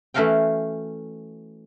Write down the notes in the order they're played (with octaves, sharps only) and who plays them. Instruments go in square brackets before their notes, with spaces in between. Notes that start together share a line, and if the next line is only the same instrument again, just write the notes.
[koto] E3 A3 C#4 F#4 F5 G5